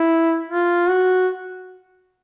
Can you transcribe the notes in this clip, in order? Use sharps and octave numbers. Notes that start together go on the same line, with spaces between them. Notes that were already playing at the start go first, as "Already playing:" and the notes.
Already playing: E4
F4
F#4